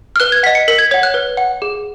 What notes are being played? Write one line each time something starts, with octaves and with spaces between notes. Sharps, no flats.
F6
B4 F#6
G#6
D#5 F#5 B6
C#7
A#4 B6
G#6
C#5 F#5 G#6
F#6
B4
F#5
G#4